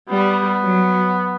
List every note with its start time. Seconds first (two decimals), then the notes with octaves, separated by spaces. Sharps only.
0.10 G3 B3
0.61 F#3